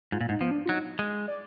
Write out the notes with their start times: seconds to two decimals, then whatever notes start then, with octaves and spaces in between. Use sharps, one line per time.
0.12 G#2 F4
0.21 A#2
0.29 G#2 D#4
0.41 F3 B3
0.51 D4
0.66 F4
0.69 F#3 D#4
0.99 G#3
1.28 D5